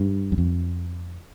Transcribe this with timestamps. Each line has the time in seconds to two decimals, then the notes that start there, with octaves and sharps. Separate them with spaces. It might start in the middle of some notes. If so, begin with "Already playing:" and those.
Already playing: G2
0.32 F#2
0.38 F2